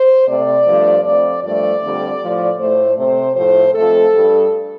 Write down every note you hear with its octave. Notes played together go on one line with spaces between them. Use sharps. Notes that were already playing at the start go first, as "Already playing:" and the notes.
Already playing: C5
C3 A3 D5
G2 F3 A3
F2 F3 A3 D5
G2 F3 A3 D5
F2 D3 G3
A2 F3 A3
A2 A3 C5
C3 A3 C5
A2 F3 A3 C5
F2 F3 A3 A4
G2 G3